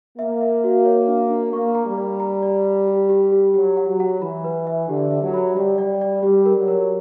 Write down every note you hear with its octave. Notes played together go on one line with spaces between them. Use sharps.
A#3 E5
E5
F#4
C#5
D4
D4
A#3 C#6
A#5
G3
D5
A#5
D5
D5
G4
G4
G4
F#3 G4
F#5
F#3
F#5
E3 B5
B4
E5
D3 G4
E5
F#3
B5
G3 G4
D5
D5
G3 G4
A#4
F#3
A#4